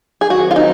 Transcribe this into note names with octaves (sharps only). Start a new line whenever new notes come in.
G#4
D#3 F#3 C4 F#4
F4
D#4